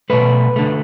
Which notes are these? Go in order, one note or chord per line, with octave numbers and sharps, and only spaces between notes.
B2 A3 B4
D3 A3